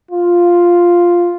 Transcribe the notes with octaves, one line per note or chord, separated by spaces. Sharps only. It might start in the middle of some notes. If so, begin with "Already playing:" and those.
F4